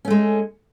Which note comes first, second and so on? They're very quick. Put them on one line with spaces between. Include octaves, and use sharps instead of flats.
C#4 A3 G#3